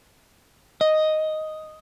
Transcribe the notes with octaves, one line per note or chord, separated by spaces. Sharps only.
D#5